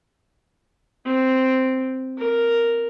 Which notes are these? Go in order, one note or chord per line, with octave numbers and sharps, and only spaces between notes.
C4
A#4